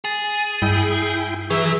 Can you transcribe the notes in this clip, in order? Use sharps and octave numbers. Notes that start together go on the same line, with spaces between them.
G#4 A6
G2 E4 G5 G6
E3 F#3 G#4 E5